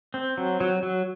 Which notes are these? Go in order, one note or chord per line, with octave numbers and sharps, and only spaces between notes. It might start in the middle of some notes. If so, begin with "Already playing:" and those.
C4
F#3
F#3
F#3